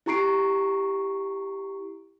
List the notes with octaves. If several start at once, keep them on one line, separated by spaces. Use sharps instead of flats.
E4 G4 A#5 C#6 C7 D7